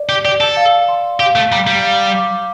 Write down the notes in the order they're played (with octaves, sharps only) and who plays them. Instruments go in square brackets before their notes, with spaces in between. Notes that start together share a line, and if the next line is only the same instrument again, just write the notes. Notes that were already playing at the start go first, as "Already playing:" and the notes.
Already playing: [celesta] D5
[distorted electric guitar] G4
[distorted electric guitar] G4 [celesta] D5
[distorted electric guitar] A4
[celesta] F5
C6
[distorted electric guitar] G4 [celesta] F5
[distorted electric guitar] A3
[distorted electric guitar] G3 [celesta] A#5
[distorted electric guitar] G3
[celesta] F5
D6